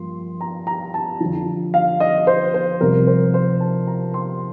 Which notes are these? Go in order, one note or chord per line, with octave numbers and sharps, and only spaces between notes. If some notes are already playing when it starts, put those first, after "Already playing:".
Already playing: G2 F3 A#3 C6
A#5
A#5
A5
F2 D3 F3
F5
D#5
C5
C5
F2 C3 G3 A#4
C5
C5
A5
A#5
C6